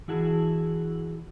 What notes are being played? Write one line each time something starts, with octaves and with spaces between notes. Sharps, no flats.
E3 E4 F#4 G#4 A5